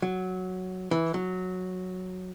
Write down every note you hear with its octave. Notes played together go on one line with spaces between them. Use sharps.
F#3
E3
F#3